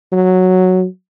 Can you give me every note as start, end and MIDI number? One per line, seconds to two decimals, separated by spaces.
0.12 0.85 54